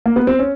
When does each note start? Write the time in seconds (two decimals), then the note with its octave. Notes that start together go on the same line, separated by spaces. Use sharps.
0.06 A#3
0.16 B3
0.27 C4
0.39 C#4